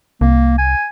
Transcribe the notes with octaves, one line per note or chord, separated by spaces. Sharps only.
C2 A#3
G#5